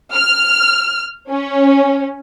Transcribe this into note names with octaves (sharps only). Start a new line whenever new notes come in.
F6
C#4